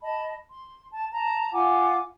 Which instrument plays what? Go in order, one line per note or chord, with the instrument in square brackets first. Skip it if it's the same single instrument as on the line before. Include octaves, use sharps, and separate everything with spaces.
[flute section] D#5 A5 B5
C6
A5
A5 A#5
F4 F#5 G#5 D6